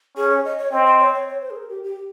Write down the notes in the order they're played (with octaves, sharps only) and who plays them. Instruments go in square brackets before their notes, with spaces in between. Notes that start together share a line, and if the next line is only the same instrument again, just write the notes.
[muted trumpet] C#4 [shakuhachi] G#4
[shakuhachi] C#5
D#5
C#5
[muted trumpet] C4 [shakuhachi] D#5
[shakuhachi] D#5
C#5
C#5
C#5
C5
G#4
A#4
G4
G4